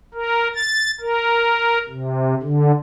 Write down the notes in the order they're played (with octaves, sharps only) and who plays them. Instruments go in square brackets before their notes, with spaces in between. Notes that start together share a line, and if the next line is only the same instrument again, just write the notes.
[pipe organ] A#4
A6
A#4
C3
D3